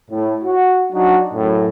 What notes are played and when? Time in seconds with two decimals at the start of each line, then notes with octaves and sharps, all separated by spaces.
0.10 A2
0.43 F#4
0.91 F#3 D4 D#4 F#4
1.33 F#2 A2